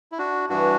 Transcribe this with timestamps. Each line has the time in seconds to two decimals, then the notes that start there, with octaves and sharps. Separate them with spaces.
0.12 E4
0.18 D4 F#4
0.49 G2 E3 D4 F#4